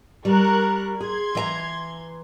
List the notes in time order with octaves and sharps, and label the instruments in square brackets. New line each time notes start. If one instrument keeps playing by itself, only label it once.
[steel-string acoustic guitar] G3 [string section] A#4 C#6 F#6
[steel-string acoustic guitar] G#4 [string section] C6 G#6
[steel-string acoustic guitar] E3 D#5 A#5